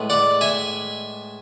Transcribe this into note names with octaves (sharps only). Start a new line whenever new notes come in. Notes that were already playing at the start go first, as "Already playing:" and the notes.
Already playing: A2 G#3 B3
D5 F#5
E5 G#5